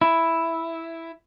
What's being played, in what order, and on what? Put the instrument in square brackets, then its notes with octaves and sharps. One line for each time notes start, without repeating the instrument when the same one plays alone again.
[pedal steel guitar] E4